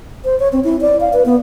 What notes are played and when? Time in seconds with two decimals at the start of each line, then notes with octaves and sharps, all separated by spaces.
0.25 C5
0.40 C#5
0.53 C4
0.64 E4
0.81 D5
1.00 F5
1.13 B4
1.25 B3